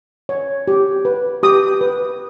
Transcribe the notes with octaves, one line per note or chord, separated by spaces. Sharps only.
C#5
G4
B4
G4 D#6
B4